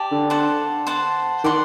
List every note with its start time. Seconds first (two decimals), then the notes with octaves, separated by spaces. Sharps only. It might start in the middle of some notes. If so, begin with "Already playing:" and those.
Already playing: G4 D5 A5
0.11 D3
0.30 C5 F#5 A5
0.87 C5 F#5 A5
1.44 D#3 D5 F#5 C6